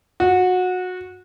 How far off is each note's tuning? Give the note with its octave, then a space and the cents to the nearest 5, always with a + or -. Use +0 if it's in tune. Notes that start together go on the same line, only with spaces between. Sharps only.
F#4 -20